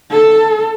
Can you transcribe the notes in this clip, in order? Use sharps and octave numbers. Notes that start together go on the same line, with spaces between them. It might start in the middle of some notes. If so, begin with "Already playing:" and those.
A4